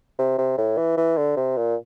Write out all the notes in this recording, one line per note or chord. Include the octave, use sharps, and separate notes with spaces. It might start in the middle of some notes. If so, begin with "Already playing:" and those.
C3
C3
A2
E3
E3
D3
C3
A#2